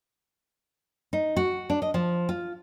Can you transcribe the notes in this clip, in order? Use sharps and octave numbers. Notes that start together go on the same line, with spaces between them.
D#4
F#4
D4
D#5
F3
F4